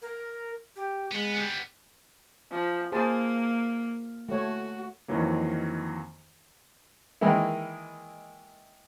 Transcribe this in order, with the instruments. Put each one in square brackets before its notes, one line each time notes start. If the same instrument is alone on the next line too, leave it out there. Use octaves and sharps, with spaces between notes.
[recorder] A#4
G4
[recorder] G#3 [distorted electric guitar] B3
[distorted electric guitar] G3 B3
[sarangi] F3
[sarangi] A#3 [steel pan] G#4 C5 A5
[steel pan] A3 C#5 [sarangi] F#4
[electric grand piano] F2 D#3 E3 F#3 A#3
[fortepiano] D#3 E3 G#3 A#3 E4